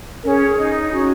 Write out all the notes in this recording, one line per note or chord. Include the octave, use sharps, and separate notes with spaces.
C#4 G#4 A#4
C#4
D#4
C#4 F#4